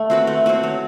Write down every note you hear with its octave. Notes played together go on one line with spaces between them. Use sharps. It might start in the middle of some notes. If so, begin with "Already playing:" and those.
Already playing: A3
C4 F#4 B4
A3
C4 F#4 B4
F#3